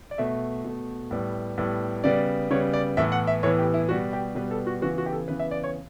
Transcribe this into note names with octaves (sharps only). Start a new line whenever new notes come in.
D5
B2 A3 E5
B2 A3
A2 G3 B3
A2 G3 B3
C#3 G3 B3 D5
C#3 G3 B3 C#5
D5
A2 E3 B3 E5
F#5
E5
A2 E3 B3 C#5
G4
E4
B2 G3 B3 F#4
G4
B2 G3 B3 B4
A4
F#4
C#3 E3 B3 F#4
F#4
G4
A4
C#3 E3 B3 B4
E5
D5
C#5